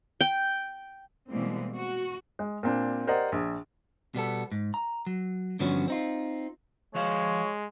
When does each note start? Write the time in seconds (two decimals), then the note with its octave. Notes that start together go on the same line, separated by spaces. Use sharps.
0.21 G5
1.29 B2 E3 G3 G#3 A#3 C4
1.75 F#4
2.39 G#3
2.63 A#2 C4 D4
3.07 G4 A#4 C5 D5 D#5 F#5
3.32 A#1
4.15 B2 G3 B3 A4
4.52 G#2
4.74 A#5
5.07 F#3
5.59 G2 D3 F3 F#3 B3 C#4
5.88 C4 D#4 F4
6.95 F3 G#3 F#4 C#5 F5